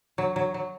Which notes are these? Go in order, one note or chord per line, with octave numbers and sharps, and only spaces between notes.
F#3
F#3
F#3